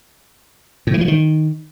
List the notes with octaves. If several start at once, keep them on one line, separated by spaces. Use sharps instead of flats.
A2
E3
F3
D#3